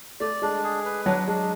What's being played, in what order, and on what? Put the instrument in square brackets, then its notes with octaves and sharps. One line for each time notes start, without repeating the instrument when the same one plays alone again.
[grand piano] A3 [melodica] D5
[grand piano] G#3 [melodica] D4
[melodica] G#4
B4
[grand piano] F#3 [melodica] D4
[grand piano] G#3 [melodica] D4